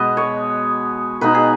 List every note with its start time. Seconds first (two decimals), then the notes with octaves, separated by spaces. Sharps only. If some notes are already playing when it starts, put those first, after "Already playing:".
Already playing: B2 G#3 B3 D#5
0.17 C#5
1.21 B2 B3 D#4 B4
1.34 G#4